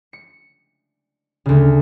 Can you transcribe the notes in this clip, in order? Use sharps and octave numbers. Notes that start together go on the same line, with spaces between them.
C#7
D2 C#3